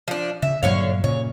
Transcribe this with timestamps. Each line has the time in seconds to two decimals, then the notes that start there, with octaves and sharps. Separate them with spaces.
0.08 F3 D4
0.42 C#3 E5
0.63 G2 A#2 D3 F#3 C#5 F5
1.04 A#2 C#3 C#5